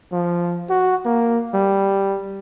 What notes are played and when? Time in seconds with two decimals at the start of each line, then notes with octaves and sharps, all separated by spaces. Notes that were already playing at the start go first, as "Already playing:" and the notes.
0.12 F3
0.70 F#4
1.05 A#3
1.54 G3